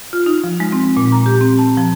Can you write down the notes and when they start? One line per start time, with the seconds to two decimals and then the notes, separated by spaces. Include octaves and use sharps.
0.13 F4
0.26 D#4
0.44 F3
0.60 G#3
0.72 C4
0.97 A#2
1.12 A#5
1.26 G4
1.41 C4
1.58 A5
1.77 F3